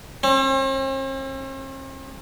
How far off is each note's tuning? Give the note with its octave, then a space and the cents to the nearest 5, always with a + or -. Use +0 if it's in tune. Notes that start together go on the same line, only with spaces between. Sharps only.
C4 +45